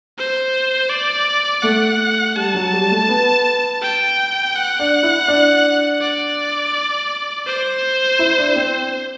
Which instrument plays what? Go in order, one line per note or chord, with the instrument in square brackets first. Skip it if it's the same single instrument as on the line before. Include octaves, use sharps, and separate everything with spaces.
[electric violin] C5
D5
[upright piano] A3 [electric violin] F#5
[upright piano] G3 [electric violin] A5
[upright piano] F#3
G3
A3
B3
[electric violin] G5
F#5
[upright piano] D4
E4
D4
[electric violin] D5
C5
[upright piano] E4
D4
C4